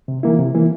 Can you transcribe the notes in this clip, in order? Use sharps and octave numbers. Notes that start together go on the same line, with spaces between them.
C3
E3 A#3 E4
C3
E3 A#3 E4